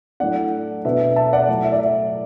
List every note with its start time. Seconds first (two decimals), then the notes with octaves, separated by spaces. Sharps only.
0.20 A2 F#3 A3 D4 D5 F#5
0.85 B2 B3 D4 E5
1.00 E5
1.16 E5 A5
1.33 D5 F#5
1.48 A2 F#3 A3
1.64 E5
1.72 D5
1.79 E5